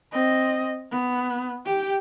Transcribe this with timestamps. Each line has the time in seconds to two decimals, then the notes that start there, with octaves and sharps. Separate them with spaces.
0.13 C4 D#5
0.91 B3
1.66 G4 G5